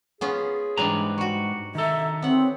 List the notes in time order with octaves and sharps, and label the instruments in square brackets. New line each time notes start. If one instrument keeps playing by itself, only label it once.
[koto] B3 C#4 F4 [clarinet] G#4
[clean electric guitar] G#2 B4 A#5 [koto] E3 G3 D4
[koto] G3 F#4 [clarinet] C#6
[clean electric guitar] D#3 A4 [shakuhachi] E5 [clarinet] A#5
[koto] B3 F#5 [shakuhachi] C4 [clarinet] C#5